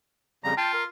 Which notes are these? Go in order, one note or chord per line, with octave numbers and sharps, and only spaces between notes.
F2 C#3 G3 A#5
F4 G5 A5
A#4